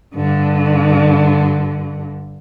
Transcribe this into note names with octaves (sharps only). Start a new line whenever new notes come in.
G2 D3